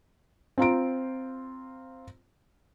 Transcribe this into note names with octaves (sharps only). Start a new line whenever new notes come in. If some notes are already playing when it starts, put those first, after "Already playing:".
C4 F4 A#5 D7